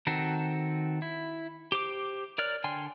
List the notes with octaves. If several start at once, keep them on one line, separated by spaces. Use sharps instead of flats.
D#3 C4 F#4 A4
E4
G4 C5 D6
A#4 C#5 D5 F6 F#6
D3 G5 G#5 C6